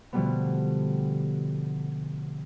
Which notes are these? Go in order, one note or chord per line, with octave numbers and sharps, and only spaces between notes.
B2 D3 F3 G3 A3 B3